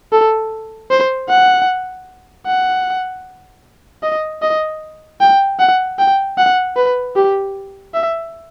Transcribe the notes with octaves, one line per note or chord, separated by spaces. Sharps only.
A4
C5
F#5
F#5
D#5
D#5
G5
F#5
G5
F#5
B4
G4
E5